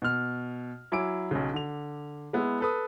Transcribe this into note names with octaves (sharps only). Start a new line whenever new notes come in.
B2 F6
F#3 E4 G#5 D6 D7
B1 C#3
D3 F7
G#3 B3 E4
A4 B4 D#6